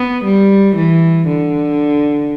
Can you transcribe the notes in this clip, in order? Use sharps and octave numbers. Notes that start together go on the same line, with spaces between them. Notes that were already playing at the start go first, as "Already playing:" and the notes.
Already playing: B3
G3
E3
D3